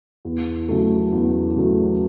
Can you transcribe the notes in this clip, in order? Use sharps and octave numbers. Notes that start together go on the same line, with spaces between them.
E2
C#3 F#3 A3
E2
C#3 F#3 A3